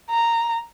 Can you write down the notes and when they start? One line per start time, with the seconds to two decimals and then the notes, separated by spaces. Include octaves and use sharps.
0.10 A#5